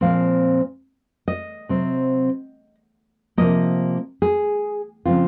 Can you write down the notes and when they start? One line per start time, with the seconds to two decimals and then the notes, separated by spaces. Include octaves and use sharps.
0.01 A#2 F3 G#3 C4 F5
1.28 D#5
1.69 C3 F#3 C4
3.37 C3 F3 A#3 D#5
4.22 G#4
5.05 C#3 F3 G#3 C4 F4